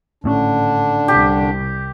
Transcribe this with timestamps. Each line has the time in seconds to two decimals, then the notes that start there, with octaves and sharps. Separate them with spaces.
0.24 G#1 A2 D3 C#4 D4
1.08 C2 G4